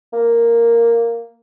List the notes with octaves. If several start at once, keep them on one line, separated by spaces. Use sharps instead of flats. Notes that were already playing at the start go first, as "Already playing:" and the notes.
A#3